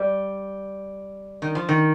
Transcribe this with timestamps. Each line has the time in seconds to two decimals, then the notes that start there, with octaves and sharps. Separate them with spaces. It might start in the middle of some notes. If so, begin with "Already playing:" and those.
Already playing: G3
1.42 D#3
1.55 F3
1.69 D#3